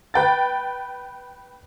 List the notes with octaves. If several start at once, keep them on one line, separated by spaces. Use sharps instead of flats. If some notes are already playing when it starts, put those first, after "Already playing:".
B4 G5 A6